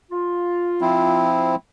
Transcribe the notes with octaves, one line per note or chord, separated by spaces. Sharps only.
F4
F3 C4 E4